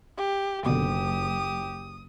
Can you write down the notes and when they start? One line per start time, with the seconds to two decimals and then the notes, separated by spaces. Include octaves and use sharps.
0.18 G4
0.66 F#1 B2 D3 G4 D#6